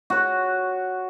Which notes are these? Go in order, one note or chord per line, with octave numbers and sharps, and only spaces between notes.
F#4 C#5